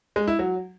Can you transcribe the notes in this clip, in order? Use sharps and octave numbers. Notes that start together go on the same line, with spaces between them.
G#3
E4
F#3